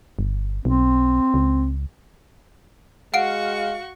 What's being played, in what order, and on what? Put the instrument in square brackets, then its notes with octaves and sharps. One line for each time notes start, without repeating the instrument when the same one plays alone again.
[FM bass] G1
[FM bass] B1 [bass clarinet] C4
[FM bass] C#2
[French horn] G#3 [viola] F#4 C#6 [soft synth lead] F5 [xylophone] F#5 D7